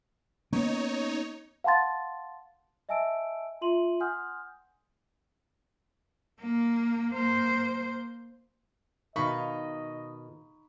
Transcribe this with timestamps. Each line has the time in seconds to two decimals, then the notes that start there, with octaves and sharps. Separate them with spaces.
0.53 A#3 B3 C#4 D#4 C#5
1.64 F5 F#5 A5 C6 A6
2.89 D#5 E5 G#5 A5 E6 D7
3.61 F4 E5 C6 D#7 F#7
4.00 F#5 G#5 C6 D#6 F6 G6
6.40 A#3
7.14 A#3 C5
9.16 B2 D#3 D#4 D#5 F5 A#5 B5 C#6